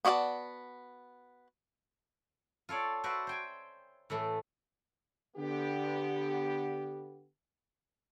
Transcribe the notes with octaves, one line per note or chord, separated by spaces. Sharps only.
B3 F#4 D5 F5 A5
F4 A4 C#5 D5
F#4 B4 C5 D5 E5
C5 G5 G#5
A2 E3 A3
D3 B3 G4